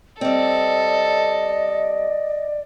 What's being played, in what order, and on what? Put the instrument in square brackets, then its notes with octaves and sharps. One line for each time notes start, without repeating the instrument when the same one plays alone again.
[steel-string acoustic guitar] G3 C4 [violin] A4 [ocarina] D5 [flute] D#5